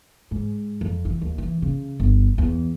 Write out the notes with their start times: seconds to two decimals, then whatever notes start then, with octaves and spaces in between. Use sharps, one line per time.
0.31 G#2
0.81 F2
1.05 E3
1.22 D#2
1.38 E3
1.62 C#3
2.00 G1
2.38 E2